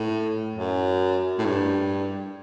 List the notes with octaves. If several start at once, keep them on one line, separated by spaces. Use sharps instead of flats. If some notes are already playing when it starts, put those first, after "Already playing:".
Already playing: A2
F#2
A2
G2